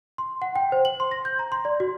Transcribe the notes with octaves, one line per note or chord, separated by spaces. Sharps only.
C6
F#5
G5
C5
F#7
C6
A#6
G6
A#5
C6
D5
F#4